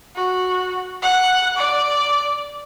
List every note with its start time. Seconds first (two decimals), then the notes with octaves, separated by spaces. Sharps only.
0.16 F#4
1.02 F#5
1.57 D5